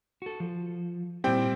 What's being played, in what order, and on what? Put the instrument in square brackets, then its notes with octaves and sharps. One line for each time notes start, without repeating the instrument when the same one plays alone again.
[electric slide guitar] F#4 A4
F3
[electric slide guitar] A#2 E4 [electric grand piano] G3 C4 G5